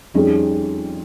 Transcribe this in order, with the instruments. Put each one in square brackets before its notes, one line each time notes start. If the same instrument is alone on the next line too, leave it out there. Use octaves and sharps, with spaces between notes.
[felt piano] F2 D#3 G3 C#4 G#4